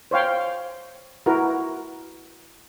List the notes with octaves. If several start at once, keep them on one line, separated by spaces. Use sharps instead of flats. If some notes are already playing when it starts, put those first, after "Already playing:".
C5 C#5 F5 G5
E4 F#4 A#4 B4